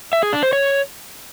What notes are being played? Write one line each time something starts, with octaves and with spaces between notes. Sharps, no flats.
E5
G#4
D4
C5
C#5